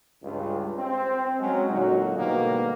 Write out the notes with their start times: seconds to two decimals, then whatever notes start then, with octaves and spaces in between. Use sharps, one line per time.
0.23 C#2 G2
0.78 C4
1.39 F#3 G#3 C#4
1.68 A#2 D3 F#3 D#4 F#4
2.15 G#2 B2 D3 D#3 G3 A#3